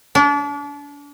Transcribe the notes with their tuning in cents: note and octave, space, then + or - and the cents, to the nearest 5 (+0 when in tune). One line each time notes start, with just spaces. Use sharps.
D4 -35